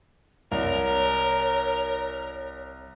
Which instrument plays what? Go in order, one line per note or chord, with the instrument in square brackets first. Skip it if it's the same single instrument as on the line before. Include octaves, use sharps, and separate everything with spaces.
[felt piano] C2 [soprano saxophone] A#4 [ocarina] C#5